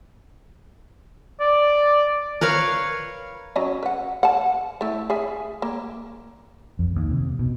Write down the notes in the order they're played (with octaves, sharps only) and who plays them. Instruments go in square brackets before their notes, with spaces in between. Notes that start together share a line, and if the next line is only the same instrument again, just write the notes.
[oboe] D5
[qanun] A#4 B4 C#5 F5
[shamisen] F#3 C#4 D#5
B4 F#5
F#5 A5
A3 E4
G#4 E5 G#5
A#3
[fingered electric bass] F2
D#2
C3
B2